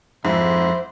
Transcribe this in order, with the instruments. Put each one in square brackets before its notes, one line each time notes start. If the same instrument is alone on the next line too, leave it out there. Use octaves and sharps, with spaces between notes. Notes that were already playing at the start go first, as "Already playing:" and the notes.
[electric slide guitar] F2 [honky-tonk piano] G#2 [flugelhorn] E4 [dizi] C5